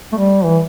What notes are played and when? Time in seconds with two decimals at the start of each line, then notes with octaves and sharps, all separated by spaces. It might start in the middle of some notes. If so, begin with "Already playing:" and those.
0.12 A3
0.17 G3
0.44 E3